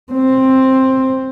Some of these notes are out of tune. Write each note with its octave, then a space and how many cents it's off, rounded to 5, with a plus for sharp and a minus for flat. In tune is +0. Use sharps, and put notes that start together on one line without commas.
C4 +10